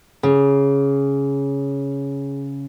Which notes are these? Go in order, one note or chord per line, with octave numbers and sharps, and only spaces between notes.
C#3 G#4